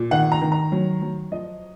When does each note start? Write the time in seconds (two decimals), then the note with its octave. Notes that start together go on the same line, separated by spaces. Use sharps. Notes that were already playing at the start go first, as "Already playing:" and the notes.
Already playing: A#2
0.11 D#3 F#5
0.32 A#5
0.42 D#3
0.52 A#5
0.72 F#3
1.02 F#3
1.32 F3 D#5